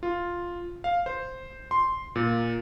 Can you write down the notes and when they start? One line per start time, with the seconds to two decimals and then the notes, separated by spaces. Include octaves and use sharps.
0.03 F4
0.84 F5
1.06 C5
1.71 C6
2.16 A#2